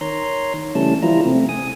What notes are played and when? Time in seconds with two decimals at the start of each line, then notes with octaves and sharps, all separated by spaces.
0.01 D#3 C#5 A#5 C6
0.75 C#3 E3 G3 A3 C#4 A5
1.03 E3 F3 G3 E4 F4 A#5
1.25 C3 A3 C4
1.49 G#5 D#6